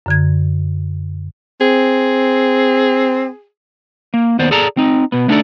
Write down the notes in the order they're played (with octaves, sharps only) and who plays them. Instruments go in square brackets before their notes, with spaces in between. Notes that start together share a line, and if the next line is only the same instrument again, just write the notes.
[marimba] F#2 D3 G#6
[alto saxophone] C4 [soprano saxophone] G#4
[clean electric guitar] A#3
D#2 B3 C5 D5
G#4 A4 D5 A5 A#5
C4 D#4
B2 B3
A3 B3 D4 D#4 A4 D5